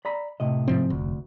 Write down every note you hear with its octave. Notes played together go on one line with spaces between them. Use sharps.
D5 A#5 B5
A2 C3 D#5
G#2 F3 C4
F1 D2